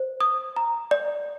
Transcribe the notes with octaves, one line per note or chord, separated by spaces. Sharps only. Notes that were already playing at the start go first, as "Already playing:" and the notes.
Already playing: C5
D#6
A#5
D5